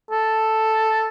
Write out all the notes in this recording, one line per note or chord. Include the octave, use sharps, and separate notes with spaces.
A4